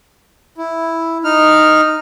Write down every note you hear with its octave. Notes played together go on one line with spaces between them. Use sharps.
E4
D#4 F6